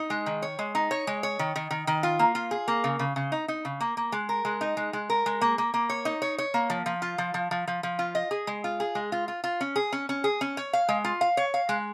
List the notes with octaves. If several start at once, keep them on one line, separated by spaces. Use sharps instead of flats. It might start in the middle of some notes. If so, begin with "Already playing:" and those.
Already playing: D#4
G#3
D#3
C#5
G#3
D#4
C#5
G#3
C#5
D#3
D#3
D#3
D#3
F4
A#3
F4
G#4
A#3
C#3
C#3
C#3
D#4
D#4
C#3
A#3
A#3
G#3
A#4
G#3
D#4
G#3
G#3
A#4
G#3
A#3
A#3
A#3
C#5
D#4
C#5
C#5
A#3
F3
F3
F4
F3
F3
F3
F3
F3
F4
D#5
G#4
G#3
F4
G#4
G#3
F4
F4
F4
C#4
G#4
C#4
C#4
G#4
C#4
C#5
F5
G#3
F4
F5
C#5
F5
G#3